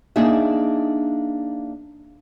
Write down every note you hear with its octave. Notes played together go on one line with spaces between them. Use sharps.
A#3 D4 D#4 G#4 E5